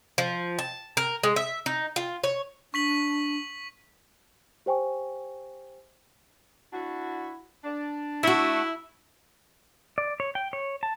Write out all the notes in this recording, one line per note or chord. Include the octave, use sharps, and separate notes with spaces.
F3
A5
A#4
G#3
E5
D#4
F4
C#5
D4 C#6 B6 F#7
G4 C5 G5 G#5 C#6
D4 E4 F#4
D4
A3 E4 F#4
D5
C#5
G5
C#5
A5